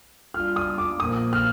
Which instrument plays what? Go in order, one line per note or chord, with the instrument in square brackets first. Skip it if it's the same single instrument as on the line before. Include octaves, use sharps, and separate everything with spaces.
[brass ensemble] G3 D4 F4 [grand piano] F6
[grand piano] D#6
D6
[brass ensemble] A#2 F3 A#3 [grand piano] D#6
[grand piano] F6